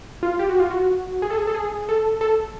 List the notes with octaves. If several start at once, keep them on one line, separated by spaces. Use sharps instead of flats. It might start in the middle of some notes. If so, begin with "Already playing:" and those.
F4
G4
F#4
F4
F#4
G#4
A4
G#4
A4
G#4
A4
A4